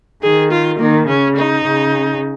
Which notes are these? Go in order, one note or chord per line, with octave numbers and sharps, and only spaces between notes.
D#3 G#4
F4
D#3 A#3
C#3 C#4
D#4
C#3